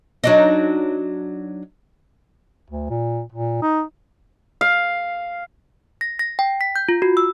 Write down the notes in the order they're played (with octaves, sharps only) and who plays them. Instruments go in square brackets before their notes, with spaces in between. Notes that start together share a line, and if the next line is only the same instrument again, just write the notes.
[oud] F#3 D4 D#4
[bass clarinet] D2
A#2
A#2
D#4
[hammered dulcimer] F5
[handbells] A#6
A#6
G5
B6
G6
F4
F#4
E6